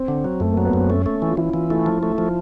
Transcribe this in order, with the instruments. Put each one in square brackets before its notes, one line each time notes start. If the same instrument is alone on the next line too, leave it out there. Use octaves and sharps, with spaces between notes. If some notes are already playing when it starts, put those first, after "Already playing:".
Already playing: [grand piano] C4
[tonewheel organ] D3
F#3
[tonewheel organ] F#2 [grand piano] A3
[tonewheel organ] F#3 [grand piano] A#3
[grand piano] B3
[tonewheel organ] F#2 [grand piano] C4
[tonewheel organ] A3 [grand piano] C#4
[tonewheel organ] A3
E3
[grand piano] F4
[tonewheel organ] E3 [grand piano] E4
[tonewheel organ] E3 [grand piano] F4
[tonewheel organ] A3 [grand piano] E4
[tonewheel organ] F3
A3
F3